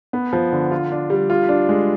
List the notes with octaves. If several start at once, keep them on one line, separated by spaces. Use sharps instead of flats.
B3
F3
D3
F4
D4
G3
F4
D4
G#3